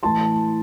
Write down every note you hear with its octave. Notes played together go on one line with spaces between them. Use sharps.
A2 E3 A5 C6